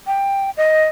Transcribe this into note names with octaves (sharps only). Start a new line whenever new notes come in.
G5
D#5